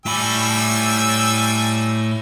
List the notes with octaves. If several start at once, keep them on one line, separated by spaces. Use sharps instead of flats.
A2 G3 G#5 B5 E6